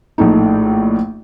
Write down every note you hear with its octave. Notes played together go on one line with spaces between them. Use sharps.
A#1 A2 A3 D#4